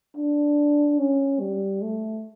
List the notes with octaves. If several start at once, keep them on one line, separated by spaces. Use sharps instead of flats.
D4
C#4
G3
A3